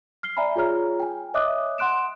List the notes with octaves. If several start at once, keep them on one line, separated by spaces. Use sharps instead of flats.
F6 C7 G7
D5 E5 G#5 A#5 B5
F4 G#4 C#5 A#5 F6
G5 G#5
C#5 D#5 E5 D6 D#6 F#6
F#5 C6 F#6 D7 E7